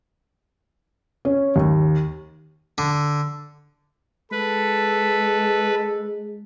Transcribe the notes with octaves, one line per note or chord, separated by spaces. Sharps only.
C#4
D#2
D3
G#3 A4 B4